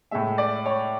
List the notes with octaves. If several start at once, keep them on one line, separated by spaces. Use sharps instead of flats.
A2 G#3 E5
D5
C#5